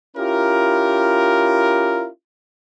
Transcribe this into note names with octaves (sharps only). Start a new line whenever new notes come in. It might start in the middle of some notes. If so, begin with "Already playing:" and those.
C#4 E4 F4 G4 A#4